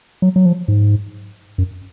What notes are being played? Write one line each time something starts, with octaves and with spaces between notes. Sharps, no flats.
F#3
F#3
F3
G#2
F#2